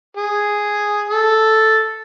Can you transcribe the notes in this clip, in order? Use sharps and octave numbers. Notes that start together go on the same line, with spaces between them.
G#4
A4